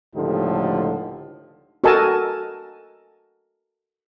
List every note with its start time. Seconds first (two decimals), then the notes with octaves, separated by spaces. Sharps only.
0.15 C#2 A2 D3 F3 D#4 G4
1.84 F#4 A4 A#4 D#5 G#5 A5